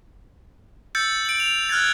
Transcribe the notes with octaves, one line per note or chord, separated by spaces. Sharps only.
E6 G6 A6 C#7
D7 F#7
F7
F6 F#6 G#6 A6